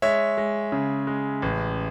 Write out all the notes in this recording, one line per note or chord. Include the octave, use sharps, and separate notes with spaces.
G#3 C#5 E5
G#3
C#3
G#3
A1